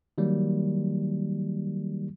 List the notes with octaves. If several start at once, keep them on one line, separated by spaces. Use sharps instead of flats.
D#3 F#3 G3 A#3